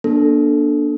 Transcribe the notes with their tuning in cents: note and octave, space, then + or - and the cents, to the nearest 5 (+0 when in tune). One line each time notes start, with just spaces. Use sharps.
A#3 +45 D4 +0 A4 +0